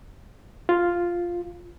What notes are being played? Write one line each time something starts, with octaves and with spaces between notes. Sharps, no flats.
F4